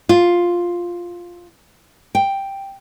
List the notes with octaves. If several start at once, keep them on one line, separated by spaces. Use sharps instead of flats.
F4
G5